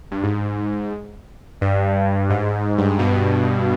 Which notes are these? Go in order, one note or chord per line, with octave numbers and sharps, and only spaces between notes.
G2
G#2
G2
G#2
G2
G#2
G2 B2